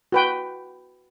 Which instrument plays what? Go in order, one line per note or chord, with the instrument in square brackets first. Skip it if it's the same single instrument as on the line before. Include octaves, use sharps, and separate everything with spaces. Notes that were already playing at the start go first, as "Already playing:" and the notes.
[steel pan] F#4 B4 G5